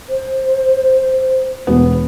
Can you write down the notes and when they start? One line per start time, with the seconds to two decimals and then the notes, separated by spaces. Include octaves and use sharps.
0.10 C5
1.67 E1 B3